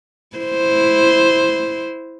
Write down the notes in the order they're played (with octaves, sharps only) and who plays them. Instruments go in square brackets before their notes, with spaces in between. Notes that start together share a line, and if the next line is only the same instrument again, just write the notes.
[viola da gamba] E4 C5